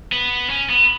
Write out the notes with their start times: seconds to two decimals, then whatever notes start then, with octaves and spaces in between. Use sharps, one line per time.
0.12 B3
0.50 C#4
0.70 B3